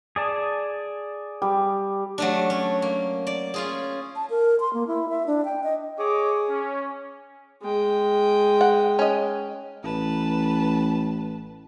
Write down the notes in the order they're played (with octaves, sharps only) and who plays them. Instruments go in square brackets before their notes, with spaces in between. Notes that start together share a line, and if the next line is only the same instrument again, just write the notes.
[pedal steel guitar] G#4 D5 A5
[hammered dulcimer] G3
[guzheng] F#3 A3 D4
C#4
A#3
D5
C#4 F4 G#4
[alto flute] A5
A#4
C6
A#3
E4
E5
D4
G5
D#5
[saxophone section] G#4 [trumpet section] C#5 D#5 D6
[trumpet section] C#4
[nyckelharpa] G#3 G5
[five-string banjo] F#5
C#4 D#5
[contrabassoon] A1 [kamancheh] B4 A5